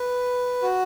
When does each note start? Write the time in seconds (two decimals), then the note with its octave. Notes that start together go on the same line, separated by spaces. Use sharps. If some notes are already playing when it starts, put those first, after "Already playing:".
Already playing: B4
0.62 F#4